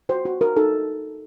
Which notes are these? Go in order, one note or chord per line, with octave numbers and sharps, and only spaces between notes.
F#4 C5
F#4
F#4 A#4
D#4 A4